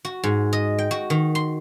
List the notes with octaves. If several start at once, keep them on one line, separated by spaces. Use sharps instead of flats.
F#4
G#2
D#5
G5
F#4
D#3
C6